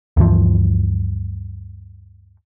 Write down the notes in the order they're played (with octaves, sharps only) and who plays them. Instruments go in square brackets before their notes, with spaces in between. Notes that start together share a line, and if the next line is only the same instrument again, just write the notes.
[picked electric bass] D2 G2 E3 F3